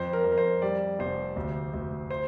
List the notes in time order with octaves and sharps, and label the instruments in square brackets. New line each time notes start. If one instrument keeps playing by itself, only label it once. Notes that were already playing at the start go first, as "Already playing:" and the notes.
Already playing: [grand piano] F2 C5
A#4
F2
A#4
C5
G3 D5
F1 C5
D2
D2
C5